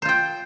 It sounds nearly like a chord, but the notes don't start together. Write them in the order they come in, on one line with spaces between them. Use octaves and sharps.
C5 F4 G5